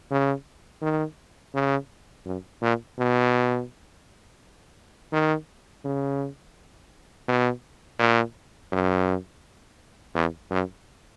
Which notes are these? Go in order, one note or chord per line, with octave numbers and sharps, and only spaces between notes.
C#3
D#3
C#3
F#2
A#2
B2
D#3
C#3
B2
A#2
F#2
E2
F#2